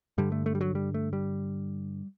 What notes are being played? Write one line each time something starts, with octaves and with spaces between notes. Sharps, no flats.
G2 D3 G3
A3
A3
G3
F#3
G3
A3
G3